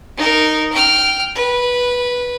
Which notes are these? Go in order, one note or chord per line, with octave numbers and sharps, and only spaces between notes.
D#4 A#4
G5 F6
B4